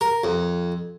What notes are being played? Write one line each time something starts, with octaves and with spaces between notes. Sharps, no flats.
A#4
F2